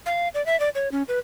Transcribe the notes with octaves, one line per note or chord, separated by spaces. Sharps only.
F5
D5
E5
D5
C#5
C#4
B4